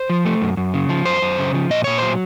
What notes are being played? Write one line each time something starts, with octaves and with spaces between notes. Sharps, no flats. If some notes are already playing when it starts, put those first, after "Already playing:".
Already playing: C5
F3
A3
F#2
F#2
C#3
F3
F#2 C5
F#2
C#3
F3
A#2 D#5
A#2 C#5
F#3 C5